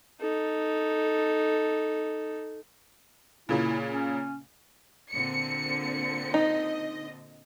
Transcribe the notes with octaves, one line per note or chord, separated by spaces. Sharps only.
D#4 A4
A#2 C#3 A#3 E4
C#4
A#2 D3 C4 C#7
D#4 D#5